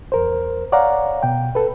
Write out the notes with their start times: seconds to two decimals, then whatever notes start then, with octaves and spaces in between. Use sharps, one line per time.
0.12 E2 A#4 C5
0.72 C#5 D5 F5 F#5 A#5
1.23 B2 G5
1.55 A4 B4